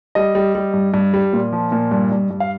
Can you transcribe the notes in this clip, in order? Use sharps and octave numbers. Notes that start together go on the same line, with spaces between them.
G3 D#5
G3
G3
G2
G2
G3
A#2
F3
A#2
G2
G2
G2
F5